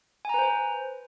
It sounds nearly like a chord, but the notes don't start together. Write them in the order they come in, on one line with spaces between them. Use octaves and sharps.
G#5 A#5 B4 C5